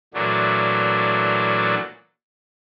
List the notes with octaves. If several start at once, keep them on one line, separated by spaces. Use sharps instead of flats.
A#2 E3 F#3 A3 D4